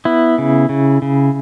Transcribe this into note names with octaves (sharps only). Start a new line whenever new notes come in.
B3 E4
C#3
C#3
C#3